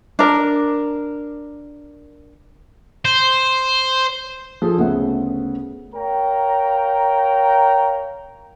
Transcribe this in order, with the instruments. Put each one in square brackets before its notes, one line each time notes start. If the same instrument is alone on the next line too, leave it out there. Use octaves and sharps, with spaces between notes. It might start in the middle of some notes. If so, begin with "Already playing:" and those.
[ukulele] D4 A#4
[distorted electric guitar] C5
[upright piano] F3 G#4 A4
D2 C#3 B3 E5 F#5
[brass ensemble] A#4 C#5 F5 G5 A#5